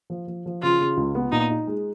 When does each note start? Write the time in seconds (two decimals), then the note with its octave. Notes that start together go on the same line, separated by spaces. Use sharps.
0.10 F3
0.27 F3
0.46 F3
0.62 C#3 F4
0.80 C#3
0.97 C#2
1.15 B3
1.32 A#2 D#4
1.50 D#4
1.67 G#3